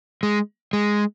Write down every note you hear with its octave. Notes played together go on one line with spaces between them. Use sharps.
G#3
G#3